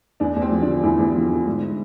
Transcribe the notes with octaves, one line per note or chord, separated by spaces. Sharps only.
E2 D4
E2
C4
F3
D4
D3
E2 E3 E4
E2
F3
D3
G#2